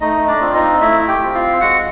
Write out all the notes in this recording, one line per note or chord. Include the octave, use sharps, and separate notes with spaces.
A3 D#4 D#5
D4 D5
C4 F4
D#4 D#5
A3 E4 E5
G4 G5
C4 F4
F4 F5
G#3 F#4 F#5